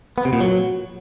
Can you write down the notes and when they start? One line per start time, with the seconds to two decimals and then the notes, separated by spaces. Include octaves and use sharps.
0.18 B3
0.25 C3
0.33 A#2
0.40 F#3